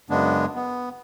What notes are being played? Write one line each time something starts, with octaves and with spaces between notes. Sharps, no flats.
F#2 C#3 G#3 B3 D4
B3